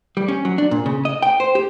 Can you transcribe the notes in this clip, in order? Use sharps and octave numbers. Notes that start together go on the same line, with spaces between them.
G3
C#4
F#3
D4
A#2
C#3
D#5
G5
C5
G4